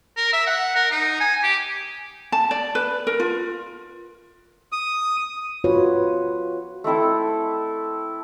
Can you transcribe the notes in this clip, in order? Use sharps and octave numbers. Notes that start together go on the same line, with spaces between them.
A#4
E5
F#5
A#4
D#4
G#5
G4
A5
D5
B4
A#4
F4
D#6
F4 F#4 B4 C#5
A3 C4 E4 A4